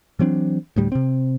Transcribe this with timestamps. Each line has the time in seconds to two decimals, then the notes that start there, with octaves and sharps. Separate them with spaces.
0.19 E3 F#3 C4 D4
0.76 D2 A2 G3
0.92 C3 C4